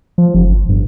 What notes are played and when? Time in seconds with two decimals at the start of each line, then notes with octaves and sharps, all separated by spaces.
0.18 F3
0.34 F#1
0.52 G1
0.69 G2